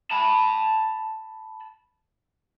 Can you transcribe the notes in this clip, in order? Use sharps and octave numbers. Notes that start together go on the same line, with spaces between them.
A5 B5